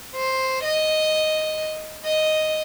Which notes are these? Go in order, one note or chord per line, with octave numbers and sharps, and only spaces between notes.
C5
D#5
D#5